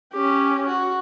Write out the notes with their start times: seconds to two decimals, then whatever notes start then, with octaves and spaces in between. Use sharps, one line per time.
0.13 C#4 G4
0.67 F#4